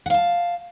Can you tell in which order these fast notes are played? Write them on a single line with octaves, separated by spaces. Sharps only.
F#5 F5 A5